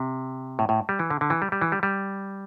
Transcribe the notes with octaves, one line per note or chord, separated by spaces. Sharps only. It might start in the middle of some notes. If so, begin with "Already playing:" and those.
Already playing: C3
A2
A2
G3
E3
D3
D3
E3
G3
G3
E3
G3
G3